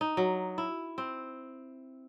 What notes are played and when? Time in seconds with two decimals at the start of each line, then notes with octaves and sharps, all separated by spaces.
0.01 D#4
0.17 F#3
0.58 E4
0.98 C4